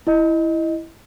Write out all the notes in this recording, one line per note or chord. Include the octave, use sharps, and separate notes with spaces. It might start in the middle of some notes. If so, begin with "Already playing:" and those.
E4 D#5